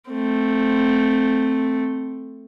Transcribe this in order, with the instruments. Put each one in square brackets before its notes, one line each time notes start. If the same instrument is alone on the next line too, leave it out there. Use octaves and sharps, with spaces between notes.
[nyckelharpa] A3 C4